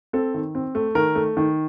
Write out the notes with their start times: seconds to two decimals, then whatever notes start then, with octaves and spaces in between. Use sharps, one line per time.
0.13 C4 A4
0.34 D#3
0.55 C4
0.75 A3
0.95 D#3 A#4
1.15 A3
1.37 D#3